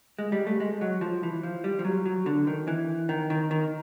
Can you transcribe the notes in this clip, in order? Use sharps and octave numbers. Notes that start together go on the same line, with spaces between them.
G#3
G3
A3
G#3
F#3
F3
E3
F3
G3
F3
F#3
F#3
D3
D#3
E3
D#3
D#3
D#3